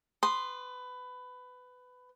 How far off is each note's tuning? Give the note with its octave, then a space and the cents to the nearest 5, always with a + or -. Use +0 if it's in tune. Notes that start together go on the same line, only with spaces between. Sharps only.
B4 +20 C6 +0 D#6 -25